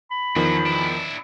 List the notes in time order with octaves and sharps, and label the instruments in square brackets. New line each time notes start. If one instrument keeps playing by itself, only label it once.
[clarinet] B5
[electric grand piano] E2 D#3 F3 [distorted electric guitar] F#3
[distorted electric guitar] D4 E4